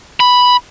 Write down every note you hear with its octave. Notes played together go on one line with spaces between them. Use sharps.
B5